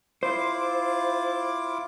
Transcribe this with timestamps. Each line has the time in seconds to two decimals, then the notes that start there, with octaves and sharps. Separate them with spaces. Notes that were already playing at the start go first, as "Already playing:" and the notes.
0.23 E4 F4 C5 D6